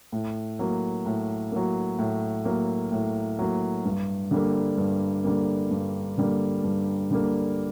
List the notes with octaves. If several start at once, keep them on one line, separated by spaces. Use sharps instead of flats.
A2
F#3 A#3
A2
F#3 A#3
A2
F#3 A#3
A2
F#3 A#3
G2
D3 G3 A#3
G2
D3 G3 A#3
G2
D3 G3 A#3
G2
D3 G3 A#3